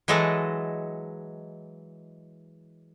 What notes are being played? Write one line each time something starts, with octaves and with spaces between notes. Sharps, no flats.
E3 F#3 G#3 A4 D#5